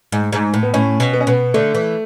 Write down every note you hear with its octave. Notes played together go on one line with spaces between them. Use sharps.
G#2
G#2
A2
B3
A2 C#4
B2
B3
C#4
B2 B3
D3 A3
E3